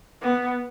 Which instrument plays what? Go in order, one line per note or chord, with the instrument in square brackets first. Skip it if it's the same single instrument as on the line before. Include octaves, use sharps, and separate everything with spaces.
[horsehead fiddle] B3